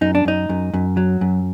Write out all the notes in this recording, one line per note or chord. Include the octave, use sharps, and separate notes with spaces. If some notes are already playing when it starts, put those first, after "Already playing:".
F#2 D#4
D4
F#2 D#4
F#2
F#2
F#3
F#2